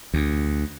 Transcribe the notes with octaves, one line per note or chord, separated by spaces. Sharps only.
D2